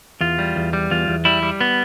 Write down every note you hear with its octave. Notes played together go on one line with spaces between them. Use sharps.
E2 F4
G3
E2
G3
E2 F4
E2
G3 E4
G3
B3